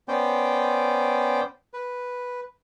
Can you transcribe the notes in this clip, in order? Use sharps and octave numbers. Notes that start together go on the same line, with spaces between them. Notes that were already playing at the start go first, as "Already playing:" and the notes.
B3 C#4 C5 D5 G5
B4